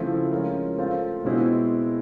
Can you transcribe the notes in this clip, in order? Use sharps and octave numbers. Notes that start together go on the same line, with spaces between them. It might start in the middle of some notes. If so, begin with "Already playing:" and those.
Already playing: C#3 F3 A3 C4 E4
G#3 C#4 F4 A#4
A3 C4 F4
B2 G#3 C4 E4